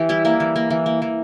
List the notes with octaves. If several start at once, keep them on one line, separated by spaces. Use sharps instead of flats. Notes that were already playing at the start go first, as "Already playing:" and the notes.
Already playing: E3 G4
G3 E4
A#3 E4
E3
A#3
E3
A#3
E3